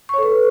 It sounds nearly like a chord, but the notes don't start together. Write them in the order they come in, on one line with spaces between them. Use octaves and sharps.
C#6 C#5 A4 B4